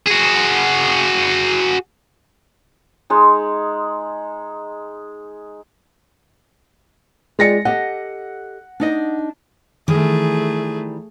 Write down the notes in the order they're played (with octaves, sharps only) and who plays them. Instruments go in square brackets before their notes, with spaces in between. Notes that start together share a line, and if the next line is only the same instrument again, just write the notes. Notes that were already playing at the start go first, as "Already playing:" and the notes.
[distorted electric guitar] F#4 G#4
[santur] G#3 D#4
[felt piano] G#3 A#6 C#7 [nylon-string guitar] F4 D5 G5
[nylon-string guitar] G4 A4 D#5 [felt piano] F#5
[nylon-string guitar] D4 D#4 D#5
[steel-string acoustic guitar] D#3 E3 G3 [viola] A3 G#4